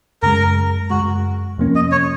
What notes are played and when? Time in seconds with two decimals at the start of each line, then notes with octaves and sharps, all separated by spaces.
0.22 F#2 C#3 G#3 A#4
0.90 F#2 C#3 G#3 F#4
1.58 F2 C3 F3 A#3 C#4
1.75 D#5
1.92 C#5